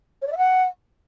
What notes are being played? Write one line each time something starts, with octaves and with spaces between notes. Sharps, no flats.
C#5
D5
E5
F#5